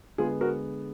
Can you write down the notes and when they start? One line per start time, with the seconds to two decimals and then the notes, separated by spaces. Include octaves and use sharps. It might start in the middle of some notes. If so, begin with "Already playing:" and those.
0.18 D3 G#3 B3 F4 G#4
0.41 F#4 A#4